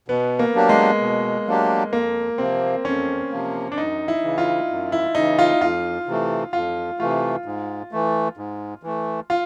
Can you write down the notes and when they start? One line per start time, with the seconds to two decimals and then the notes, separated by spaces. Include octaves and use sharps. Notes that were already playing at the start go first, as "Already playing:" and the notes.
0.08 B2 B3
0.39 A#3
0.54 F#3 A#3 D4 G4
0.69 G#3
1.01 B2
1.47 F#3 A#3 D4 G4
1.93 F2 A#3
2.38 C3 F3 A#3 C4
2.85 F2 C#4
3.31 C3 F3 A#3
3.72 D4
3.77 F#2 D#4
4.08 E4
4.23 C#3 E3
4.38 F4
4.69 F#2
4.92 E4
5.15 C#3 E3 D#4
5.39 F4
5.61 F2 F4
6.07 C3 E3 A3
6.53 F2 F4
6.99 C3 E3 A3 F4
7.46 G#2
7.92 E3 A3
8.37 G#2
8.83 E3 A3
9.30 F4